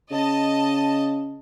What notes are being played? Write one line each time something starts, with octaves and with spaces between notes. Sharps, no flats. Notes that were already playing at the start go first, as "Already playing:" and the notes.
C#3 D#5 A5